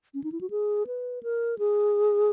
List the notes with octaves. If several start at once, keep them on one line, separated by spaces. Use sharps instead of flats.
C#4
D#4
E4
F#4
G#4
B4
A#4
G#4